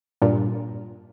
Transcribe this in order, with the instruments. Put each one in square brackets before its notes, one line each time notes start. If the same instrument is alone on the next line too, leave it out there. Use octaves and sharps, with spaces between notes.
[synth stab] G2 A#2